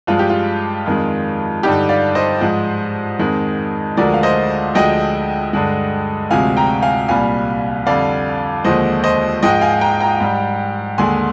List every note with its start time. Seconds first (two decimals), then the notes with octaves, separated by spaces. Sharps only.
0.07 G2 F3 G#3 F4
0.19 G4
0.30 F4
0.86 F2 D#3 G#3
1.63 G2 D3 G3 D#4 G4
1.89 D5 F5
2.15 C5 D#5
2.41 G#2 F3 G#3
3.19 F2 D#3 G#3
3.97 D2 D3 F3 G#3 A#4 D5
4.14 F5
4.23 C5 D#5
4.74 D2 D3 F3 G#3 D#5 G5
5.53 G2 D3 G#3
6.31 D2 C3 F3 G#3 F5 G#5
6.57 G5 A#5
6.82 F5 G#5
7.08 C2 A#2 G3 F5 G#5
7.86 F2 D3 G3 D5 F5
8.64 D#2 D3 F3 G#3 C5 D#5
9.04 C5 D#5
9.43 G#2 F3 G#3 D#5 G5
9.61 F5 G#5
9.81 G5 A#5
10.00 G5 A#5
10.20 G#2 G3
10.98 D#2 D3 G#3 G#5 C6